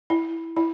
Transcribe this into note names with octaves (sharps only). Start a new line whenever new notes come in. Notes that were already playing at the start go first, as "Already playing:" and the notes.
E4
E4